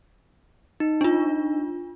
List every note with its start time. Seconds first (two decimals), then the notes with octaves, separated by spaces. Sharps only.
0.80 D#4
1.01 D4 F4